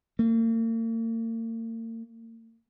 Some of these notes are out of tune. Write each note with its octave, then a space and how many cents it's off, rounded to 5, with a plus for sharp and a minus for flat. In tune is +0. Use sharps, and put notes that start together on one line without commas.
A#3 -45